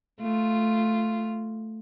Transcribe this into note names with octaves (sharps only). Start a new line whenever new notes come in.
A3 F4